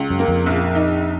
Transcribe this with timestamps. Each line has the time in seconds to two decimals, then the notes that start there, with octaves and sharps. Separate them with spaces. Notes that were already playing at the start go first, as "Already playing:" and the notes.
Already playing: C#2
0.10 F#2
0.19 A#3
0.28 F2
0.46 A#1
0.75 D#4